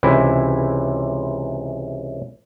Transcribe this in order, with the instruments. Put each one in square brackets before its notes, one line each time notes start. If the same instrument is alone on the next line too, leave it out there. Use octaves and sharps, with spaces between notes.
[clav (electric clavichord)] C#2 C3 E3 E4